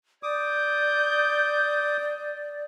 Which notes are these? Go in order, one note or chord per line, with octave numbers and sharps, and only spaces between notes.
D5 D6 D#6 G6